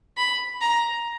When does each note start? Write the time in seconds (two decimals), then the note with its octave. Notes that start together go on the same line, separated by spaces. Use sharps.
0.17 B5
0.61 A#5